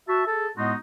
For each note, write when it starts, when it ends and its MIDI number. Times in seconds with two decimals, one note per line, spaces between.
0.08 0.23 66
0.08 0.23 76
0.08 0.23 81
0.27 0.48 68
0.27 0.48 69
0.57 0.74 45
0.57 0.74 56
0.57 0.74 59
0.57 0.74 63
0.57 0.74 66
0.57 0.74 84